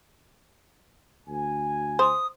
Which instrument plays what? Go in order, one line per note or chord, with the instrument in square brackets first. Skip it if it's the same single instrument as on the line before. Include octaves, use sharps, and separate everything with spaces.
[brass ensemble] D2 G#5
[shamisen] C5 [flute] D#6